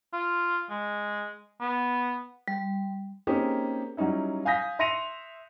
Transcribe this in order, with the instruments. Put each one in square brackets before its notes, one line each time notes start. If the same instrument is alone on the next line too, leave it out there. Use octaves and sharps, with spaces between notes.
[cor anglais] F4
G#3
B3
[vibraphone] G3
[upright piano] A#3 C4 C#4 D#4 G4 G#4
F#3 G3 C#4 D#4 E4
F5 G#5 D#6 G6 A#6 B6
E5 C6 A#6 C#7 D#7 F7